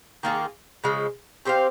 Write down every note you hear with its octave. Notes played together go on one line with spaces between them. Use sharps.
D#3 A#3 F4 G#4
C#3 F3 G#3
C4 G4 C5 F5